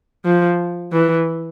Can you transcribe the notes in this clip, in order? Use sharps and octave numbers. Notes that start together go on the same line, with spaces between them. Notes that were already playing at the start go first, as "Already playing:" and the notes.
F3
E3